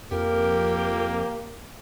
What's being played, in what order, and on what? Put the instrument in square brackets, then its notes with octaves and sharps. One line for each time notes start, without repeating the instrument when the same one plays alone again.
[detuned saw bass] F2 [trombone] A#3 [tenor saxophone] G4 [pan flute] A#4